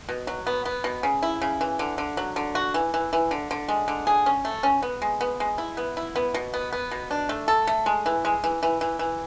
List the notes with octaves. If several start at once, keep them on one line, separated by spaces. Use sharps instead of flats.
B2
F#3
B3
B3
B2
C#3
E4
C#3
E3
D3
D3
F#3
D3
F#4
E3
E3
E3
D3
D3
G#3
D3
G#4
C#4
A3
C#4
B3
G#3
B3
G#3
E4
B3
E4
B3
B2
B3
B3
B2
D4
A3
A4
A3
G#3
E3
G#3
E3
E3
E3
E3